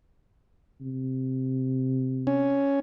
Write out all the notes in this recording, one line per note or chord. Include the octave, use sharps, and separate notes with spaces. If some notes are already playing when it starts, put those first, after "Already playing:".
C3
C#4